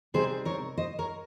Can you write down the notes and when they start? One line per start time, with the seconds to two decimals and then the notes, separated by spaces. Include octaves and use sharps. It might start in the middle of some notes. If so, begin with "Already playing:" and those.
0.14 C3 G3 C4 D#4 G#4 C5
0.45 A#4 C#5
0.77 C5 D#5
0.99 A#4 C#5